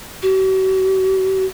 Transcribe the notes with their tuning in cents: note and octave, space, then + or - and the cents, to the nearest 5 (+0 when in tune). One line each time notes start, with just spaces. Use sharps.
F#4 +45